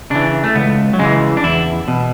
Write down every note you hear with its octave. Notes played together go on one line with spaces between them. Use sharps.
C#3 E3 D4
A3
C#2 B3
F#3
C#3 E3 G#3
D4
E2 E4
B2